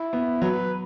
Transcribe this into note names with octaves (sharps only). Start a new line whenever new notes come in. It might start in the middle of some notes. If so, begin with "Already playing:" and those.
Already playing: E4
B3
F#3 B4